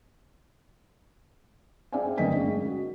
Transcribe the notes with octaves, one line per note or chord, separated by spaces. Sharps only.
C4 G#4 D5 E5 F5 G#5
G1 D2 A#3 D#5 G5 B6
G#3 C#4 G#4
F#4